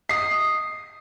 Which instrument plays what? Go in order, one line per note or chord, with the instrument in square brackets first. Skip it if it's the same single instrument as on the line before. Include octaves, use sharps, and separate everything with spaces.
[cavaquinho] D#5 D#6 [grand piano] C7